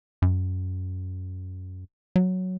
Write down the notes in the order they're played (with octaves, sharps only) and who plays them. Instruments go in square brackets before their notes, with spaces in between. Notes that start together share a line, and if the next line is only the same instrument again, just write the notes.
[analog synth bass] F#2
F#3